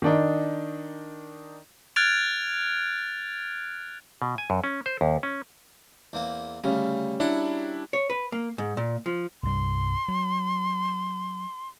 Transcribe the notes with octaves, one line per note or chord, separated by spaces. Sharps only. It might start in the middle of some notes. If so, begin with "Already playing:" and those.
D#3 D4 D#4
F6 F#6 G#6 A6 D7 F7
B2
G#5
F#2
C#4
C5
D#2
C#4
E2 A#3 C4
D2 C#3 G3 C#4
F#3 D4 E4 F#5
C#5
B4
A#3
G#2
A#2
F3
C2 G2 G3 C6
F#3